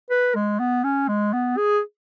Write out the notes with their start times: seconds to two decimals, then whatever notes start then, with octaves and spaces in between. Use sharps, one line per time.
0.10 B4
0.35 G#3
0.59 B3
0.84 C#4
1.08 G#3
1.33 B3
1.57 G#4